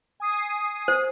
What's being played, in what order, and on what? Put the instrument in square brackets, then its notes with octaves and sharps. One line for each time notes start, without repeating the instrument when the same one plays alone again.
[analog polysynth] G#5 D#6 C7
[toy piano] C5